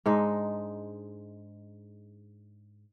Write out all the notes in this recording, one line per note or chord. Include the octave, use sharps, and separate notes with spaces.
G#2 G#3 D4 D#4